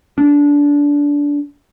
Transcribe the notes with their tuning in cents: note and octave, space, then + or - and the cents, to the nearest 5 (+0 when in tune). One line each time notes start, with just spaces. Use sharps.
D4 -20